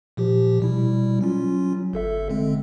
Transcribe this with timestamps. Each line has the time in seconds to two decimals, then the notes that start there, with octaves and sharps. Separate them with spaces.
0.17 A#2 F3 G4
0.60 B2 G3 E4
1.21 F#3 C#4 F4
1.93 G1 A4 E5
2.30 D3 G#3 C4